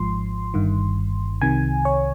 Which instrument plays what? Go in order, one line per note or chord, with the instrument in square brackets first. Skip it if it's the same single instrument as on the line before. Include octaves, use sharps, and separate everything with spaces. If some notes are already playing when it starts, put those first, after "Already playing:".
Already playing: [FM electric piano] G#1 G#2 F3 C6
G1 G2 D#3
C2 C3 D#3 G#5
C#5